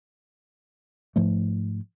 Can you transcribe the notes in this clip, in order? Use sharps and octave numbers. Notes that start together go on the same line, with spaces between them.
G#2 F3 A3